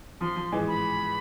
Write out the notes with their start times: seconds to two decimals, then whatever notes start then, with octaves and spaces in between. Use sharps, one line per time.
0.21 F3 C6
0.36 F3
0.52 E3 G#3
0.68 B5